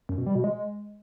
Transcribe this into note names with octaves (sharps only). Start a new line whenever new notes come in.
F#2
B2
G3
B2
G#3